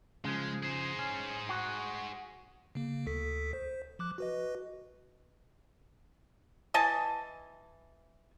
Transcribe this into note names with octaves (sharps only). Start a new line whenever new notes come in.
C#3 F3 G#3
G#4 C5
C#4
F#4
C#3 A#3
D2 A4 B6
C5
F3 D6 F#6
F#4 B4 D#5
E3 D#5 G#5 A5